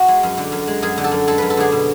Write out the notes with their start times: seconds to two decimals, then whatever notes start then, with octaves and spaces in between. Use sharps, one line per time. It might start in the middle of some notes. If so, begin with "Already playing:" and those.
Already playing: F#4
0.08 G#3
0.23 F#2
0.38 D3
0.52 F#2
0.67 G#3
0.82 F#2 G#4
0.98 D3
1.04 A4
1.12 F#2
1.27 G#3 A4
1.38 F#2 B4
1.50 A4
1.57 D3 G#4
1.72 B2